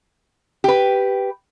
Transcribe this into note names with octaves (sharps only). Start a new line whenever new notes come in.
G4 B4